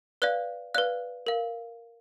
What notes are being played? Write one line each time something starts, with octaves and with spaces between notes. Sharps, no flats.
B4 D5 F5 F#6
B4 D5 F5 F#6
A#4 F5